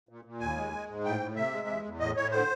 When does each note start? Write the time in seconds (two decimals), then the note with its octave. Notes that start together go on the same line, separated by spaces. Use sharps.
0.09 A#2
0.25 A#2
0.40 D#2 G#5
0.57 G#3
0.72 G#3
0.88 G#2
1.04 A2 G5
1.20 A2
1.36 C3 E5
1.52 G#3
1.67 E2
1.84 E2
2.00 A2 D#5
2.16 A2 C#5
2.31 D3 C5